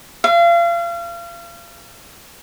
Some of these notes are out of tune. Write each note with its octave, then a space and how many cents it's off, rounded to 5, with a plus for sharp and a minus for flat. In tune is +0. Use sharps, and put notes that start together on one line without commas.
F5 -35